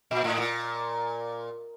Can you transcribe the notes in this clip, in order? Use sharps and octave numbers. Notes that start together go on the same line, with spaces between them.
A#2
A2
A#2